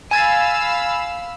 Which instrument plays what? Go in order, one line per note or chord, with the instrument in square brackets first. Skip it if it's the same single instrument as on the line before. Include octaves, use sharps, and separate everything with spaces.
[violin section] F5 B5 E6 [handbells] G#5 G#6 A6